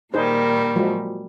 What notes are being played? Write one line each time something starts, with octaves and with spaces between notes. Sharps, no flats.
A#2 D#3 G3 D#4 G#4 C5
F3 F#3 G#3